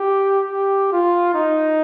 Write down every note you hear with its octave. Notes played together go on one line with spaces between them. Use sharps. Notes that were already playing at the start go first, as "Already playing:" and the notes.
Already playing: G4
G4
F4
D#4